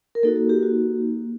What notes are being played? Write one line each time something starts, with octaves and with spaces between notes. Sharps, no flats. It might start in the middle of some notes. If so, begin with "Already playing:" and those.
A#4
A#3 D#4 F#4 A4
A4
G4
F#4